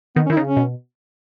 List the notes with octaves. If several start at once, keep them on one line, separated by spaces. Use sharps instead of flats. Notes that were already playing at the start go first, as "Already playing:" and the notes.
D#3 B3
C#4
D#3 E4
C#3 D#4
C#4
B2